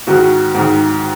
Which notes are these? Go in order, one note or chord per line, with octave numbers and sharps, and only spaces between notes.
G#2 D#3 F#4
G#2 D#3